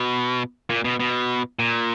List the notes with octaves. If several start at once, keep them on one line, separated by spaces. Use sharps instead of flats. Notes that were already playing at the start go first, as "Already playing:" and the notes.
Already playing: B2
A#2
B2
B2
A#2